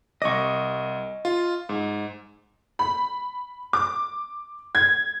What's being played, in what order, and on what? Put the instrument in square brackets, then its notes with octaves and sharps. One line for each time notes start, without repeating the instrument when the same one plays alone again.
[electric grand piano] C2 D6 [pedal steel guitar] D#5 C#6
[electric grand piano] F4
G#2
[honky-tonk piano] B5
D6
G#6